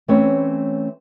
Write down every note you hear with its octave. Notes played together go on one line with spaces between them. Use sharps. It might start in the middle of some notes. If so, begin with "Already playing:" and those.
E3 A3 C4 C#4 B4 C#5